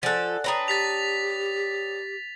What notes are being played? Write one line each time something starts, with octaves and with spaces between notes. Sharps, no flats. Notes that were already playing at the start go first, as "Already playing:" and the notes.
F3 A4 D5 F#5 G#5 F#6
D4 B4 C#5 G5 A#5 D#6
G4 A6 B6 F7